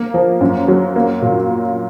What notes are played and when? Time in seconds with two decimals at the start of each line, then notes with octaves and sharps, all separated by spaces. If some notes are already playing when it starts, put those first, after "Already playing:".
Already playing: A#3
0.14 F3
0.41 F#2
0.68 F#3
0.96 A#3
1.22 A#2